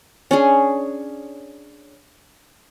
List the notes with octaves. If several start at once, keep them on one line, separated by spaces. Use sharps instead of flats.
C#4 D4 G#4